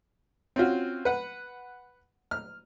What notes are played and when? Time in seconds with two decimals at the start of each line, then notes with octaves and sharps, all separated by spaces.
0.56 C4 C#4 F4 F#4
1.05 B4 F#5
2.31 F6